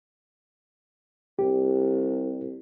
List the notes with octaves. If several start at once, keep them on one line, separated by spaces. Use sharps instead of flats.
C2 G4